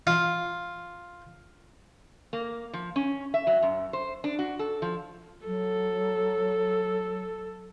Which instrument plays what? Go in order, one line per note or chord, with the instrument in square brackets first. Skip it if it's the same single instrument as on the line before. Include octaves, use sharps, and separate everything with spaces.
[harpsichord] F4
[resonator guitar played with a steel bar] A#3
F3
C#4
E5
F#3
F#2
C5
D4
F#4
A4
F3
[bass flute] F#3 [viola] A4